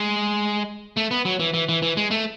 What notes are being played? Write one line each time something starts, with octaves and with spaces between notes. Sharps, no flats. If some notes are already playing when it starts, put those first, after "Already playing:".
Already playing: G#3
A3
B3
F#3
E3
E3
E3
E3
G#3
A3